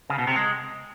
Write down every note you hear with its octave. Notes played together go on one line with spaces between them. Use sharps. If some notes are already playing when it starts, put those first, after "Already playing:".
C#3
B2
C3
G#3